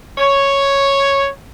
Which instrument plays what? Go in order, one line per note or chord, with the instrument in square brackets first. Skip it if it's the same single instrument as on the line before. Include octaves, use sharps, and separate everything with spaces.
[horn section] C#5